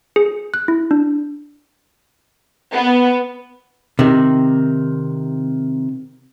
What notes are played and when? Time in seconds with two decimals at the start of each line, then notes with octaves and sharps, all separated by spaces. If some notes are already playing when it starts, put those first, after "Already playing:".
0.16 G#4
0.54 F#6
0.68 E4
0.91 D4
2.73 B3
3.99 C3 D#3